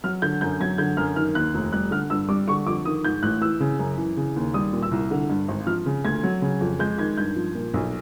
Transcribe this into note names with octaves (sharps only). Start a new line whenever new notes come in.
F#3 F6
D3 G6
F#2 G6
F#3 G#6
D3 G6
F#2 F6
D#3 F6
D#2 F#6
F1
G3 F#6
D3 F6
G2 E6
G3 D6
D3 C#6
F2 D6
D#3 D#6
G#2 G6
A1 F#6
E3 E6
C#3
F#2
E3
C#3
D#2
G3 D#6
A#2
E6
C2
D3
G2
G#1
F3 F6
C#3
D2 G#6
F#3
C#3
F2
G#3 G6
D#3 G#6
G2 G6
F3
A#2
B1